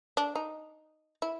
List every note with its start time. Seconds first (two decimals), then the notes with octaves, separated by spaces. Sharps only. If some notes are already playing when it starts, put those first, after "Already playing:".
0.17 D4
0.35 D#4
1.22 E4